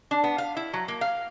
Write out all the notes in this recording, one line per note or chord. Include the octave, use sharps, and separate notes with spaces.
D4
B3
F5
E4
F#3
A#3
F5